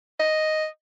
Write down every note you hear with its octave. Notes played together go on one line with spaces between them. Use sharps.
D#5